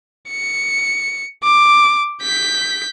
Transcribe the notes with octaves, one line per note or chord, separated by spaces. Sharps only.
C#7
D6
G6 B6